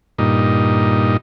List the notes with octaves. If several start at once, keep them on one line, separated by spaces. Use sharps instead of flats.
G2 A#2 D#4